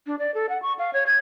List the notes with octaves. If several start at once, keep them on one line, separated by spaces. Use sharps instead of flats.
D4
D5
A4
F#5
C#6
F5
C#5
G#6